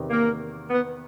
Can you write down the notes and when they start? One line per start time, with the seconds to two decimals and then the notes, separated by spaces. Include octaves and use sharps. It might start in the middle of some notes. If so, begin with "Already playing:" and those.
Already playing: E2 C3 D#3
0.10 A#3
0.70 B3